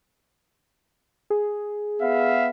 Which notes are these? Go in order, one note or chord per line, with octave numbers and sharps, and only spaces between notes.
G#4
B3 E5 F5